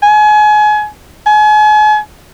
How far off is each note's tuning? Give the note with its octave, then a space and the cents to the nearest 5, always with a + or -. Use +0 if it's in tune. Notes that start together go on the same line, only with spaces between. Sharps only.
G#5 +30
G#5 +40